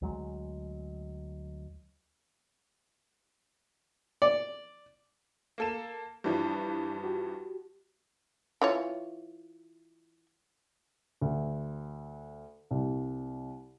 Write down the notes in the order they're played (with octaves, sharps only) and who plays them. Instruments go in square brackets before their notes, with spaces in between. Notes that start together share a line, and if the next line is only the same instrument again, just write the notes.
[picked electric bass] D2 F#3 G#3
[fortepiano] D5
[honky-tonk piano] A#3 A4 E7
[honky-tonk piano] G2 E3 F3 [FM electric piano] D4 E4 G4
[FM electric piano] F#4 G4
[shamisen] E3 F4 C#5
[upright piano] D2
C2